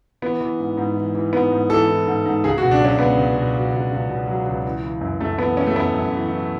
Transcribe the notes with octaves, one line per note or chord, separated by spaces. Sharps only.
E3 B3
E3
G#2
G#2
E3
E3
G#2 B3
G#2
E3 A4
E3
G#2
G#2
C#2 G#4
F#4
B2
D4
F#3 C#4
C#2 B3
C#2
B2
F#3
C#2
C#2
B2
F#3
C#2
E3
E3
F#2
F#2 A3
E3 B3
E3 C#4
A3
F#2 B3
F#2
E3
E3